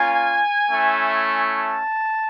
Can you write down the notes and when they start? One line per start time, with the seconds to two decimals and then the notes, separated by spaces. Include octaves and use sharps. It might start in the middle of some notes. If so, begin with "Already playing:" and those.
Already playing: A#3 C#4 F4 G#5
0.70 A3 C#4 E4
1.40 A5